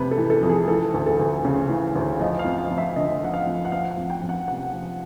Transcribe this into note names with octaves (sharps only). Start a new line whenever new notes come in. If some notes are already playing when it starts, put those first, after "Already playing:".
Already playing: F2 C3 B4
A4
E3
A4
F2
G#4
E3 A4
D2
A4
D2
C#3
E3
D2
F3 D#5
F5
F2
F5
F2
E5
D3 D#5
F3 F#5
F5
F2
F#5
F3 F5
F#5
F2
G5
F2
F#5
C3 F#5
F3